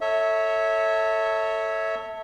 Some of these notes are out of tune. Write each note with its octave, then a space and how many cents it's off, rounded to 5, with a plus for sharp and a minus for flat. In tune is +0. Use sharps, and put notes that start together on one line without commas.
A4 +20 C#5 +0 E5 -20